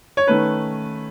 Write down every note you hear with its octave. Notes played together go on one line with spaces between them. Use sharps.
C#5
D#3 A3 C#4 B4